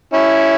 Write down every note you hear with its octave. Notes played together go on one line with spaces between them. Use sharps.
C#4 E4